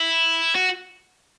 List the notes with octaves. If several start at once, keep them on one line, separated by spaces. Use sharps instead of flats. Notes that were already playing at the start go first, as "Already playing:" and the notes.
Already playing: E4
F#4